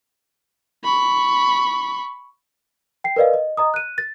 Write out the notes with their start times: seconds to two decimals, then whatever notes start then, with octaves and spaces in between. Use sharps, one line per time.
0.85 B5 C#6
3.04 G5 C7
3.16 A#4 B4 D5 D#5 F5
3.34 D#5
3.57 D#5 A#5 D#6
3.74 F#6 D#7
3.98 A6